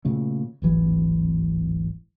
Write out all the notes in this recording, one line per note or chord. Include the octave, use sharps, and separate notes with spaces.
A#2 C#3 A3
D1 G#1 E3